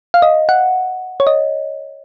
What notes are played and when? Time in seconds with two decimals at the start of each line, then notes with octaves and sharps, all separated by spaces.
0.14 F5
0.22 D#5
0.49 F#5
1.20 C#5
1.27 D#5